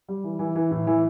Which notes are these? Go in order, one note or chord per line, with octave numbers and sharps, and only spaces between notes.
G3
E3
E3
E3
A2
E3